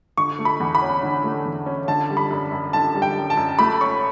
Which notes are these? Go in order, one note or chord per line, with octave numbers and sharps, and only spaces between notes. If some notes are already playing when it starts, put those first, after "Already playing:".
D3 C#6
A3
B5
E2
B5
C#4
D3
A3
E2
C#4
D3 A5
G3
B5
F#2
F#2
D3 A5
G3
G5
F#2
A5
F#2
A3 B5
C#4 C#6